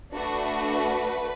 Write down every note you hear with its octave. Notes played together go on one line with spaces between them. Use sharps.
A3 D4 F#4 B4